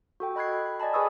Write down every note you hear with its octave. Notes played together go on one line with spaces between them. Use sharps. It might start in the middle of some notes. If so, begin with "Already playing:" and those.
F#4 A4 G5
D#5 B5 F#6 G#6 C7
D5 D#5 G#5 A5 B5
G#4 B4 G#5 C#6 D#6 E6